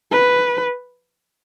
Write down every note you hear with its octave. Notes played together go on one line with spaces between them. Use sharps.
B4